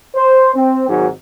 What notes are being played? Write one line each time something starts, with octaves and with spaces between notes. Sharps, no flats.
C5
C4
G#1 G#2 F#3 F#4